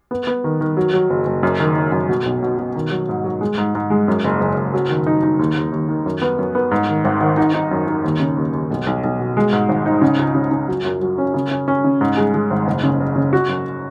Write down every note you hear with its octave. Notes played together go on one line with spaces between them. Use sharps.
B3
B3
D#3
D#3
F#3
F#3
F#1
F#1
F#2
D#3
D#3
F#2
B2
B1
B2
B2
D#3
F#3
G#2
F#3
G#3
G#2
G#2
G#3
F#2
F#1
F#1
F#1
F#3
D#3
D#4
D#4
D#2
D#2
D#2
D#3
F#2
B3
F#2
B3
G#2
D#3
G#1
D#3
D#4
D#4
F#2
D#4
D#2
C#3
D#2
D#2
B1
B1
B1
B2
G#3
G#2
G#1
D#4
C#3
C#2
C#3
C#3
F#3
F#2
F#3
C#4
C#3
C#4
C#4
C#3
G#2
G#3
G#3
G#1
F#1
C#3
F#1
C#3
F#4
F#2